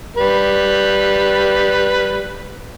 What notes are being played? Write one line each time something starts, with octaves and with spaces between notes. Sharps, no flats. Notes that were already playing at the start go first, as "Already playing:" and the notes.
G3 B4